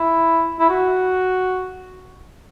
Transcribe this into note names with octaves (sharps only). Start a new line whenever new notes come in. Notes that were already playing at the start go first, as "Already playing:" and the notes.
Already playing: E4
E4
F#4